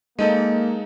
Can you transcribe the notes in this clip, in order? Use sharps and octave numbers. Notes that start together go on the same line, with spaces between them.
G#3 A#3 D#4 A4 D#5